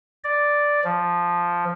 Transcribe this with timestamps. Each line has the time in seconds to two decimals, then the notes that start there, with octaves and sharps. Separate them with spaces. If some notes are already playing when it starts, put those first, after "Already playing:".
0.24 D5
0.84 F3